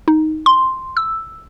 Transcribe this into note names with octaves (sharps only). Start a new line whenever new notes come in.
D#4
C6
E6